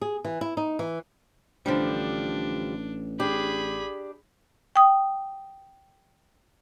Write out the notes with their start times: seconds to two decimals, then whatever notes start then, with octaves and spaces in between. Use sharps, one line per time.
0.02 G#4
0.25 E3
0.41 E4
0.57 D#4
0.79 E3
1.66 A1 D3 F3 G3 D4
3.20 D4 G4 G#4 B5
4.76 G5 D#6